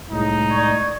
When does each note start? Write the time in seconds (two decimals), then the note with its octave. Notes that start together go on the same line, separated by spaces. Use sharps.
0.11 C2 A2 G#3 D#4
0.50 D5 C#6 G#6